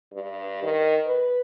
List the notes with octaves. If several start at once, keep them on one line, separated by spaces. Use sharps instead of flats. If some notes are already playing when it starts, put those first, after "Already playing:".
G2
D#3
B4